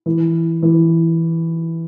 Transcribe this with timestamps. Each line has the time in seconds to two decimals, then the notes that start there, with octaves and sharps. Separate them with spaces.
0.06 E3
0.63 E3